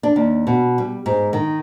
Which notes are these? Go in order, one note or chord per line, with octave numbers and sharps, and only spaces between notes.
D4
D#2
B2
G3
G#2
D#3